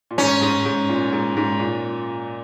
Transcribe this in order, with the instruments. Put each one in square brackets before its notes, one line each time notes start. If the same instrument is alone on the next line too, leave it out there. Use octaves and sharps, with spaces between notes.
[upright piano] A#2
[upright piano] G#2 [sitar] C#4
[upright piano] G#2
G#2
A#2
G#2
G#2
A#2